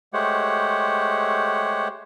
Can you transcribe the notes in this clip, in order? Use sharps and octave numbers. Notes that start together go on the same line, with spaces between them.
G#3 A3 G4 C5 C#5 F#5